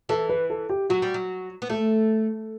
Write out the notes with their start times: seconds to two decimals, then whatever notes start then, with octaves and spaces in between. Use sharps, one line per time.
0.09 E3 A4
0.29 B4
0.50 A4
0.69 G4
0.90 F#3 F#4
1.02 G3
1.14 F#3
1.62 B3
1.69 A3 A4